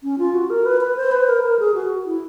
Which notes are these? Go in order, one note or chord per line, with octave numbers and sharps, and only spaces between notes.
C#4
F4
F#4
A#4
B4
B4
C5
B4
A#4
A#4
G#4
F#4
E4